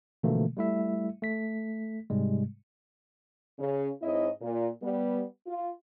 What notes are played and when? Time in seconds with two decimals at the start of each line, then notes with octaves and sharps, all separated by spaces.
0.23 B2 D3 E3 F3 A3 A#3
0.57 G3 A3 E4 E5
1.22 A3 B6
2.10 G#2 C3 G3 G#3
3.58 C#3
4.01 G#2 C4 E4 C#5 D#5
4.40 A#2
4.82 G3 B3
5.46 F4